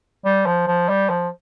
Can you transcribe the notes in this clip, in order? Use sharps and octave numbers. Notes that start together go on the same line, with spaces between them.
G3
F3
F3
G3
F3